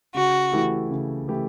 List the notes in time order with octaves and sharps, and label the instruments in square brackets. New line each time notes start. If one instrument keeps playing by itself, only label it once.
[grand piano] C#3 [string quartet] F#4
[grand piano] E3 A3 E4 G4
C#3
E3 A3 E4 G4